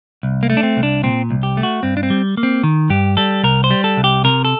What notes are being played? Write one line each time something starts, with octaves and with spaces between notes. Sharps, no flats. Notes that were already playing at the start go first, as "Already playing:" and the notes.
C2
A#3
A3
D4
C4
C2
D4
A#2 C4
C2
G4
A3
F#4
G2 C4
D4
C4
G3
A#3
C4
D#3
G2 G4
G3 A4
C2 A#4
C5
G3
A4
C2
G4
C3 A#4
A4